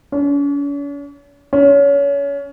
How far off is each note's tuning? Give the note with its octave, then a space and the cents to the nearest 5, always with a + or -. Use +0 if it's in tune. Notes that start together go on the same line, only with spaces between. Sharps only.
C#4 +45
C#4 +25